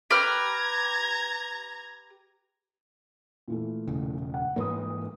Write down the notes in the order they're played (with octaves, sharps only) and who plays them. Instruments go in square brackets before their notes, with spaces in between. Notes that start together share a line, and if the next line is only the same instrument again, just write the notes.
[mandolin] G4 B4 F6 [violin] A#5 G#6
[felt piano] A#2 E3 A3
[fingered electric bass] E1 C#3
[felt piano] F#5
[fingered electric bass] G#2 E3 A#3 [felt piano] B4 D#6